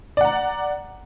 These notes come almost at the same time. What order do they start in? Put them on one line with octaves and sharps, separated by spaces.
D5 F#5 A#5